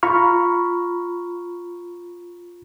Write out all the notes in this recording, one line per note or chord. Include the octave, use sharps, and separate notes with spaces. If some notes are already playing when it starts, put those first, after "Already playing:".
F4 A#5 B5 C#6 F6